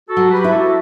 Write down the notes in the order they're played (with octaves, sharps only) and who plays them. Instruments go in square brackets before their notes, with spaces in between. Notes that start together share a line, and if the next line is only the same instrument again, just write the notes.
[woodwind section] F#4 A4
[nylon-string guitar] F#3
[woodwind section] G4 B4
[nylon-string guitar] E4
[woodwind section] F#4 A4